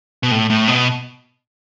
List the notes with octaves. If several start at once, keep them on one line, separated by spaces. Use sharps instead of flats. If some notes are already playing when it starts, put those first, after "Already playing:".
B2
A2
A2
B2